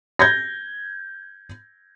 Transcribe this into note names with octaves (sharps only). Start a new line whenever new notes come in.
G6 G#6 A#6